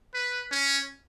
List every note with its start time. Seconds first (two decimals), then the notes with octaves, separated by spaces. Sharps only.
0.14 B4
0.51 C#4